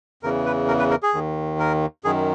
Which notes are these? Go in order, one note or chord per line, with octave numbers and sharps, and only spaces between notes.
E2 C#3 E3 A#4
B4
A#4
B4
A#4
G#4
D#2 D#3
A#4
F#2 D#3 G#4